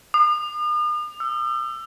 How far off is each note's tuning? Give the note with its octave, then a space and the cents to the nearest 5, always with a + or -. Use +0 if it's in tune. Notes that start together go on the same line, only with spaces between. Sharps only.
D#6 -45
E6 +25